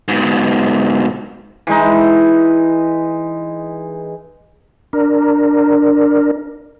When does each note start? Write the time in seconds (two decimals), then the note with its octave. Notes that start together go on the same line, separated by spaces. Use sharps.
0.08 G#2 B2
1.67 E3 G#3 D#4
4.93 D4 A#4